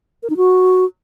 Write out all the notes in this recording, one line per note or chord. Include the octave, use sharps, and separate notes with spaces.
A#4
D#4
F#4